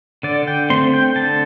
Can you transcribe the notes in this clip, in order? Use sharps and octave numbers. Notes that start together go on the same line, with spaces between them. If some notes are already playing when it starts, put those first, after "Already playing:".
D3 D5
G5
A3 C4 C6
G5
D3 A5